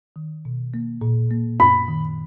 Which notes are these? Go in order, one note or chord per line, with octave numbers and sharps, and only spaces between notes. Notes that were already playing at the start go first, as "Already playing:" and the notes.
D#3
B2
A#3
A#2
A#3
F#2 B5
D#3